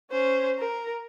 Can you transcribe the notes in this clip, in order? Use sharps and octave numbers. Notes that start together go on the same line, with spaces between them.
C#4 C5
A#4